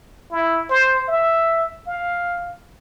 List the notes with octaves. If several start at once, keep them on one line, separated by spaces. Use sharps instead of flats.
E4
C5
E5
F5